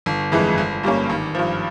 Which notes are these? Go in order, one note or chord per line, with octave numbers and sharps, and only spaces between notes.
G1
F2 E3 G#3
G1
G2 G3 A#3 C#4
G#1
G2 F3